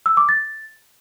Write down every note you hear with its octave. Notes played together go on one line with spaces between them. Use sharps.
E6
D6
A6